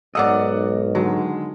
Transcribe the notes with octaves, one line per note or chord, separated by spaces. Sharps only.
B1 G#2 A#4 D5 D#5 F#5 E6
D3 D#3 F#3 G#3